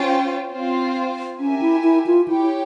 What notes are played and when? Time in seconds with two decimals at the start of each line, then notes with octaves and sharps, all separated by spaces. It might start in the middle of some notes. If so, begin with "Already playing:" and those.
Already playing: C#4 F4 C5 G5
0.51 C4 F4 C5
1.39 C#4 G4 A#4 E5 G#5
1.61 E4
1.83 E4
2.06 F4
2.28 E4 G4 C#5 G5